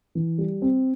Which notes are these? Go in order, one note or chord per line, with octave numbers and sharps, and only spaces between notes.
E3
G3
C4